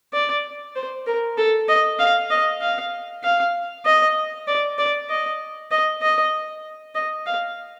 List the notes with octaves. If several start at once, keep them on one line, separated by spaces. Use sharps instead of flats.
D5
C5
A#4
A4
D#5
F5
D#5
F5
F5
D#5
D5
D5
D#5
D#5
D#5
D#5
F5